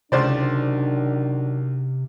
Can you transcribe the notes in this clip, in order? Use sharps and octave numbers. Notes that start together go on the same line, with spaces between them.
C#2 C3 D#3 F#3 D4 C5 D5